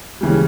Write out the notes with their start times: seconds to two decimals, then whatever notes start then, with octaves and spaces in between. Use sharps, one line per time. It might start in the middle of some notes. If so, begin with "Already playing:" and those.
0.21 C#3 E3 G3